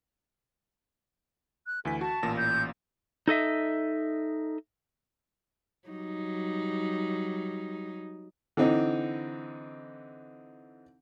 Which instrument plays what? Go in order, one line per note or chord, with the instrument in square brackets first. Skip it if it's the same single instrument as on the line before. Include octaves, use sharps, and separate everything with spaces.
[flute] F#6
[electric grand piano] D2 E3 B6 [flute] G#5
[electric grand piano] F#4 [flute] A5
[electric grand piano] A1 A#2 A#6
[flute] G6
[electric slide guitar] D#4 A4 D#5 E5
[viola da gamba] F#3 G3 D#4
[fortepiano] D3 E3 C4 D#4